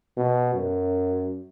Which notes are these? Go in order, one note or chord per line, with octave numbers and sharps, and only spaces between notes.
B2
F#2